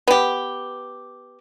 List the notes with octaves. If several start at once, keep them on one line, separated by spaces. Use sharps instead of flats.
B3 G4